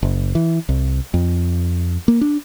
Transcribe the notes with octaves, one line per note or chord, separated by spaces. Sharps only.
F#1
E3
C2
F2
A#3
D4